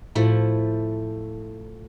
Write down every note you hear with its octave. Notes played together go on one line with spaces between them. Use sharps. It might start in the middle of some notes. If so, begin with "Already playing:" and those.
A2 F3 A3 E4